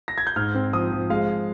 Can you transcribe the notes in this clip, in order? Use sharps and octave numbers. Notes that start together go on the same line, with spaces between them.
A#6
G#6
G6
G#2 F6
C4
F3 D#6
F3
G#3 F5